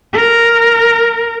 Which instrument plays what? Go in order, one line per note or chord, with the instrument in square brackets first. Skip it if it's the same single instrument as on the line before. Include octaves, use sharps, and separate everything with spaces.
[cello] A#4